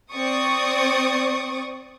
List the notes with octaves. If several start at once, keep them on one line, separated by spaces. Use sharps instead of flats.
C4 D5 C#6 D#6